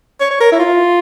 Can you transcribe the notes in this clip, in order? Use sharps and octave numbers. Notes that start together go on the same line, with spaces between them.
C#5
C#5
A#4
E4
F4